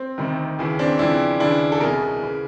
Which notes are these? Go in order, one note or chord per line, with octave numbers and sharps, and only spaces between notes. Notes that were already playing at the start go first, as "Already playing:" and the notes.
Already playing: C4
D2 C3 D#3
D#2 C#3 E3
C4 D4
F2 C#3 E3 D4 E4
D#2 C#3 E3 D4 E4
A4
C2 B2 G#4 A#4
C#3 E3